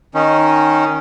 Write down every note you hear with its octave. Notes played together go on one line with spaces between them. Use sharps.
D#3 C#4 D#4